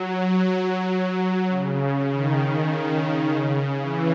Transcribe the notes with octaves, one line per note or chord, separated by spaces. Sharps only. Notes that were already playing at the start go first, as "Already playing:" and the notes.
Already playing: F#3
C#3
C#3
D#3
C#3
C#3
C#3
E3